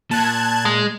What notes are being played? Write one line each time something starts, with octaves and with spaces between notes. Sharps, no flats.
A#2 A5 F#6 G#6
G#3